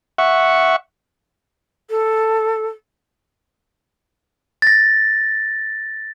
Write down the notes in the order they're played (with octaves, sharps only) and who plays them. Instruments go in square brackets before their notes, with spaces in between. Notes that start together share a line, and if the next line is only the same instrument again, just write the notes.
[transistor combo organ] E5 F#5 C#6
[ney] A4
[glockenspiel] A6 A#6